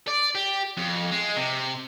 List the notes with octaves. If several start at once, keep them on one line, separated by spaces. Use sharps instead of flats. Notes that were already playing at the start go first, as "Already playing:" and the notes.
D5
G4
F2
G#3
C3